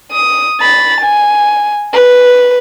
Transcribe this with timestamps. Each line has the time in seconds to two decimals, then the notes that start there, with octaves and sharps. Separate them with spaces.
0.12 D#6
0.61 B5 A6
1.01 G#5
1.93 B4